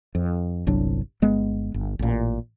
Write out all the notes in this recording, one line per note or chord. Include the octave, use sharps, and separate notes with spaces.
F2
G1 C2 F#3 D4
G1 G#3 B3
G1
A1 A#2